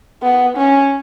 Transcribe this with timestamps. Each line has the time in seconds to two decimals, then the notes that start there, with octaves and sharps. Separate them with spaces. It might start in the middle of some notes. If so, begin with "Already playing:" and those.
0.22 B3
0.57 C#4